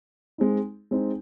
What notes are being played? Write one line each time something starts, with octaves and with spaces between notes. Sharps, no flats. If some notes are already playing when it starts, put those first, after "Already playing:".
G#3 C4 D#4
G#3 C4 D#4